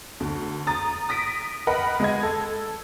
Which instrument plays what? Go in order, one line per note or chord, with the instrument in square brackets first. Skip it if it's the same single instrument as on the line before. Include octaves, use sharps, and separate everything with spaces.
[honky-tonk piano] D2
A#5 D#6 A6
D#6 A#6 B6 D7
A#4 B4 D#5 F#5 B5
G#3 G#4 D#5 G#6
A4